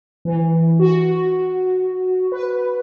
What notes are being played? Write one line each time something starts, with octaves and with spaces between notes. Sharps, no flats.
E3
F#4
B4